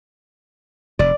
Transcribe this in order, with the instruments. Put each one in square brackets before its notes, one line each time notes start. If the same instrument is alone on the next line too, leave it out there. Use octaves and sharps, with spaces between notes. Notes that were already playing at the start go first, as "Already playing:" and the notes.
[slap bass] F1 [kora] D5